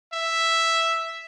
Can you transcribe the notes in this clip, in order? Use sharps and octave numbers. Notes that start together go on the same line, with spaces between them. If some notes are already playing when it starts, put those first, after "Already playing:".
E5